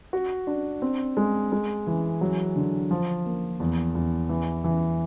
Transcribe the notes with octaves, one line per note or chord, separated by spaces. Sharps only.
F#4
D4
C4
G#3
G#3
E3
F#3
D3
F3
A#3
E2
E2
E3
E3